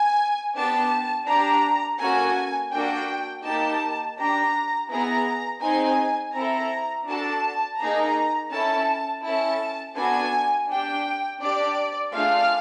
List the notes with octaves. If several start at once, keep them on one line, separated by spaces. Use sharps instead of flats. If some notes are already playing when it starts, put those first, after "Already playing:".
Already playing: G#5
B3 D4 G4 A5
D4 G4 A#5
A#3 C#4 F#4 A4 G#5
A#3 D4 F#4 A4 G5
A#3 D#4 G4 A5
D4 G4 A#5
B3 E4 G#4 A#5
C4 D#4 G#4 G#5
C4 E4 A4 A#5
D4 F#4 A4 A5
A#3 D#4 G#4 A#5
C#4 E4 A4 A5
C#4 E4 A4 A5
B3 D4 F#4 A4 G#5
D4 G4 G5
D4 G4 D5
A3 D4 F4 G#4 F5